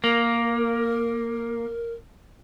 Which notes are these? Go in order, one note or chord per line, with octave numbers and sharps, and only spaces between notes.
A#3 A#4